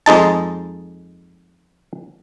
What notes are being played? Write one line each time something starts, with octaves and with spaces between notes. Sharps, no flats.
F2 G#3 D#4 A5